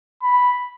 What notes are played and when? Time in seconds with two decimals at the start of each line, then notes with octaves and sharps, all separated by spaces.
0.23 B5